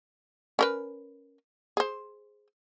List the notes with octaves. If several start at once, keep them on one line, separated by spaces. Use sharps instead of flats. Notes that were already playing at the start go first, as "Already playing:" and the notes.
C#4 A#4 B4
G#4 C5